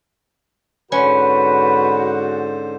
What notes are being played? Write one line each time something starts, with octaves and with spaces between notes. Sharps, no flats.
G#2 D3 C#4 F#4 B4 C5